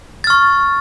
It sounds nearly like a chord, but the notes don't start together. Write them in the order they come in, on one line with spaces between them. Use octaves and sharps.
A6 F6 C#6